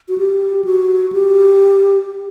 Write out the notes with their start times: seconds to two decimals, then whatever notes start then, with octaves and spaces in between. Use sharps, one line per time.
0.09 F#4
0.18 G4
0.65 F#4
1.12 G4